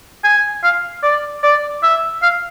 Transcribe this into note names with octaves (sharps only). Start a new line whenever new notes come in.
G#5
F5
D5
D5
E5
F5